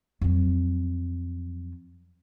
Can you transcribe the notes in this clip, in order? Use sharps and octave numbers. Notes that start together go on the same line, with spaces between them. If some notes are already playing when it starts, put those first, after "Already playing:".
F2 F#3